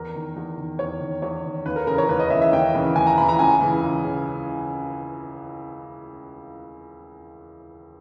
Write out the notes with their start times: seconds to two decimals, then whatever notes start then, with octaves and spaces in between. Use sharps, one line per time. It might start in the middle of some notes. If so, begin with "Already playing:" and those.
Already playing: E2 A#4
0.14 D#3
0.36 E2
0.58 D#3
0.79 E2 C#5
1.00 D#3
1.22 E2 C#5
1.45 D#3
1.66 D#2 B4
1.76 A#4
1.87 C#3 E3 A#4
1.98 C#5
2.09 D#2 B4
2.20 D#5
2.30 E3 E5
2.34 C#3
2.42 E5
2.52 D#2 G5
2.74 C#3 E3
2.96 D#2 G#5
3.07 A#5
3.17 C#3 B5
3.20 E3
3.29 A#5
3.39 C#2 G#5
3.61 C#3 E3
3.82 C#2
4.04 C#3